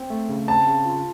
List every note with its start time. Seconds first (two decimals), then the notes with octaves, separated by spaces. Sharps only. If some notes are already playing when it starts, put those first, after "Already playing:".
Already playing: C4
0.10 A3
0.29 C#3
0.48 C4 A5
0.66 C#3
0.86 F4